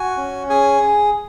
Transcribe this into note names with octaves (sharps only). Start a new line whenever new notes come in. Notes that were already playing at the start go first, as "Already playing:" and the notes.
Already playing: F#4 G#5
C#4
G#4 G#5